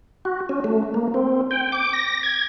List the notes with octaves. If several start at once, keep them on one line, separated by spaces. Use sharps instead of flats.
F#4
C#4
A3
A#3
C4
G5
D6
A#6
G#6